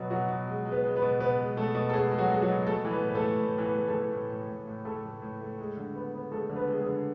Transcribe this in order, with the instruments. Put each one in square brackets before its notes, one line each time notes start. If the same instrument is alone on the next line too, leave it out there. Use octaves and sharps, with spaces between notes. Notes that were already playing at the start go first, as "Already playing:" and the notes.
Already playing: [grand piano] B2 F#3 B3 F#4
B2 F#3 F#4
B2
G#3
G#3
B3 B4
G#3
B3 B4
B2
B2 B3 B4
G#3
B2 A3 A4
B2
A4
B2 G#3 G#4
G#3
F#3 F#4
G#3
F#3 F#4
B2
A3 A4
E3
B3 B4
A2
B4
A3 A4
A2
A2
E3
B3 B4
A3
A3 A4
E3
A2
A2
A2
A2
A2 A3 A4
A3
A2
A3
G#3
D3
B3
B3
G#3 A3 A4
D3
B3 B4
G#3
G#3 G#4
D3